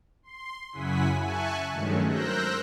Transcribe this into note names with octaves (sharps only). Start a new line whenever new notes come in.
C6
F#2 C#3 E4 F#5 G#5 B6
E5 G#5 A5 C#6 F#6
G2 D#3 F#3 G#3 A3 C#4
A#4 C5 E6 F#6 G6 A#6